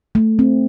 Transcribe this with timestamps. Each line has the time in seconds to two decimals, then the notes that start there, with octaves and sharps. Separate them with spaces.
0.15 A3
0.39 C4